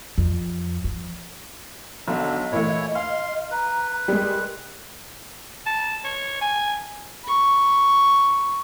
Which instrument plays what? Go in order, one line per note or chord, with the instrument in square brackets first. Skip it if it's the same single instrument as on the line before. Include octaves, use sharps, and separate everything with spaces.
[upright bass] F2
F3
[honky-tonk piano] B1 [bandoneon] D3 [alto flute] D#5
[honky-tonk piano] A#2 E3 A3 [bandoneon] E4 C#5
[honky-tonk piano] F5 [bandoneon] C6
[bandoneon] B4 [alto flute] A#5
[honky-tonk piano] G3 G#3 [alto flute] A#4
[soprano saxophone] A5
C#5
G#5
[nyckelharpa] B5 C#6